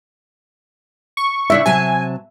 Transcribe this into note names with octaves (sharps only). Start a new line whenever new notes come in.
C#6
C#3 D4 E4 E5
C3 F#3 G#5 A5